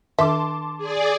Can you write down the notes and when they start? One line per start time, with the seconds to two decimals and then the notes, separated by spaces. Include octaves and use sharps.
0.19 D#3 D4 A4 E5 A5 C6 D6
0.78 G#4 D5